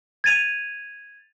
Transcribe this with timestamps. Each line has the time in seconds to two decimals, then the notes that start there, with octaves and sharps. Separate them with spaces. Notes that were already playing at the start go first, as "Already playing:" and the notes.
0.24 G#6 A6 D#7 F7